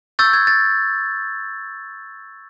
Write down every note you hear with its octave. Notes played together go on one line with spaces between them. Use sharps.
C#6 E6 G6 A6
G#6
A6